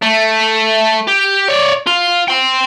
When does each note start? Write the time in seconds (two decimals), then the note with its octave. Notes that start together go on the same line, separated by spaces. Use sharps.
0.02 A3
1.07 G4
1.48 C#5 D5
1.86 F4
2.28 G5 C6